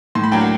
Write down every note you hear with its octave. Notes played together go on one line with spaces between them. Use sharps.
A2 C6
B5
F#3 A#3 D4 G5
F#5